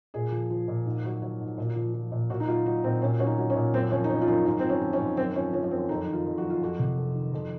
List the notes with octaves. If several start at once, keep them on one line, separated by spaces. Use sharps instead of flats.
A#2 G#4
F3
F3
A#2
G#2
F#3
F#3
G#2
A#2
F3
F3
A#2
A#2 F#4
D#4
F#3 F4
F#3 D#4
A#2 C4
A#2 C#4
F#3 C#4
D#4
F#3
C#4
A#2
F#2 C4
F3 C#4
D#4
F3 C#4
F4
F#2 D#4
G#2 D#4
F3 C4
C#4
F3
C#4
G#2
F#2 C4
F3 C#4
F3 C#4
C#4
F#2 C4
F2 D#4
D#3
F4
F2
F#4
F#3
F4
F2 F#4
C3
F2
D#3
F2